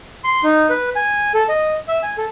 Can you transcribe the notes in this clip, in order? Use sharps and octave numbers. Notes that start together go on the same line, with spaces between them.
C6
D#4
B4
G#5
A4
D#5
E5
G#5
A4